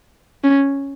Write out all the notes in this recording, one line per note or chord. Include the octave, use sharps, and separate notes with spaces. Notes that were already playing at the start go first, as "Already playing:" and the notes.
C#4